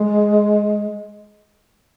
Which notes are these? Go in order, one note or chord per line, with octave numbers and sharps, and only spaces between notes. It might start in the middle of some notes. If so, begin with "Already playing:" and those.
Already playing: G#3